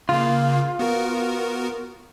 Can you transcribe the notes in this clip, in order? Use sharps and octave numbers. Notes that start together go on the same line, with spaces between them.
C#3 A#3 F4
B3 F#4 A#4